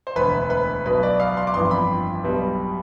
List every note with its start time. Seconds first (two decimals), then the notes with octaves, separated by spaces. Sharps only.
0.07 C5
0.16 E1 D2 D3 B4
0.50 B4
0.86 B1 B2 B3 B4
1.03 D5
1.20 F5
1.37 C6
1.47 D6
1.54 G1 F2 E3 B3 D4 C6
1.71 B5
2.24 B1 B2 G3 B3